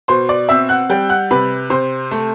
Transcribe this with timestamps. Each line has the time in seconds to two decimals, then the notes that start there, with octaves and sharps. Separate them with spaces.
0.08 B2 C5 C6
0.29 D5 D6
0.49 C4 E5 E6
0.69 F#5 F#6
0.90 G3 G5 G6
1.09 F#5 F#6
1.31 C3 B4 B5
1.70 C3 C5 C6
2.11 A3